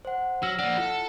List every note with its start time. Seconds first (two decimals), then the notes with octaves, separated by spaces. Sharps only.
0.05 C5 F#5
0.43 F#3 E6 F6 A#6
0.59 A#3 D4 F#5
0.78 E4 F4 A4